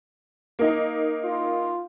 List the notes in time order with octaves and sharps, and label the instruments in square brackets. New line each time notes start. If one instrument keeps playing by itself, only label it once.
[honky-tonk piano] A#3 D#4
[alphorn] F4